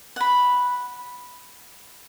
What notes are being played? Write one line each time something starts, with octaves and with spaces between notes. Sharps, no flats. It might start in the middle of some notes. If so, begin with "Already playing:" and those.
F#5 B5